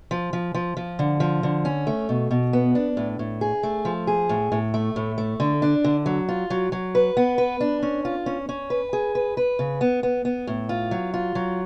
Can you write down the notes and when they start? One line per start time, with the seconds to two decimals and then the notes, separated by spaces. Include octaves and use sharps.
0.11 F3
0.33 F3
0.54 F3
0.77 F3
0.99 D3
1.20 F3
1.43 D3
1.65 C#4
1.87 A3
2.09 B2
2.31 B2
2.53 B3
2.75 D4
2.97 A2
3.19 A2
3.41 G#4
3.63 A3
3.85 F3
4.07 G#4
4.29 A2
4.52 A2
4.74 A3
4.96 A2
5.18 A3
5.40 D3
5.62 D4
5.84 D3
6.06 F#3
6.29 F4
6.50 F#3
6.72 F#3
6.95 B4
7.17 B3
7.38 B4
7.61 D4
7.83 C#4
8.05 F4
8.26 C#4
8.49 C#4
8.70 B4
8.93 G#4
9.15 B4
9.37 B4
9.59 C#3
9.81 B3
10.03 B3
10.25 B3
10.47 A2
10.69 F4
10.91 F#3
11.14 F4
11.35 F#3